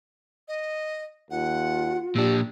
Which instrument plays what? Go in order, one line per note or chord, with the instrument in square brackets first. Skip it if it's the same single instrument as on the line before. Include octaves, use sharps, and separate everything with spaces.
[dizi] D#5
[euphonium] D#2 [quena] F4 [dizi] F#5
[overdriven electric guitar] A#2 D4 [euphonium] G4 [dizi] E6